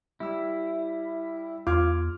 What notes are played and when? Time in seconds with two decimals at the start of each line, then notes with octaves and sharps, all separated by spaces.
0.20 G3 E4 E6
1.67 E2 F4 D6 F6 G#6